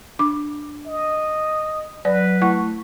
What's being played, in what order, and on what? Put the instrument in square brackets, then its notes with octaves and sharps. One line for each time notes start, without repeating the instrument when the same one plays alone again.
[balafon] D4 D6
[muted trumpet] D#5
[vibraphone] F#3 [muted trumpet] B4 [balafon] D5
[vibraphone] A3 [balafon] E4 F#5 C#6